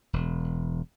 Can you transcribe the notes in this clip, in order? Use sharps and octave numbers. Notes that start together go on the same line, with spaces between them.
E1